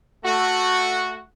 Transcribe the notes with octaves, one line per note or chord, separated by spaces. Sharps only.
A3 F#4